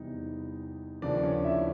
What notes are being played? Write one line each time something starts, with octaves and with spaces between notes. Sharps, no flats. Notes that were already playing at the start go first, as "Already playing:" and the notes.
Already playing: E2 C3 E3 G3 D#4
D#2 C#3 F3 D4 D5
C#4 C#5
E4 E5